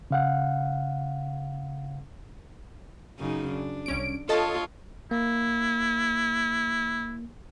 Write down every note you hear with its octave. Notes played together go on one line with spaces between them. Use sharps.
C#3 F5 F#5
F#2 C#3 D#4
D4
C2 C#4 D7
F4 A4 C#5 D#5 A5
A#3 E4